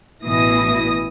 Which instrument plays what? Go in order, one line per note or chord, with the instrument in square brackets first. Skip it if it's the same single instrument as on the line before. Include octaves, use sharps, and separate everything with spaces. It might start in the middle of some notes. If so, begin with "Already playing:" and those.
[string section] A1 B2 E3 E4 D#6 A#6